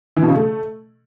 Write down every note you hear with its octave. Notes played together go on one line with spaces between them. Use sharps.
E3
B2
C#3
A3